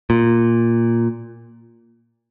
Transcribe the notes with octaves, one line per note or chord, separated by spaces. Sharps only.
A#2